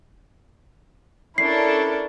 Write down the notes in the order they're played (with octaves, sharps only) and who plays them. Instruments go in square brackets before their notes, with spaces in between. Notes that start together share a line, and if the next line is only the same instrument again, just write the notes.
[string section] C#4 D4 A4 [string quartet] E4 A#4 [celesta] C7